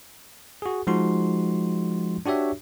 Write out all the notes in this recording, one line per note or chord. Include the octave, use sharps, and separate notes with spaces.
F#4 G#4
F3 G#3 D#4 F#4 C6
D4 F#4 G4 C#5 E5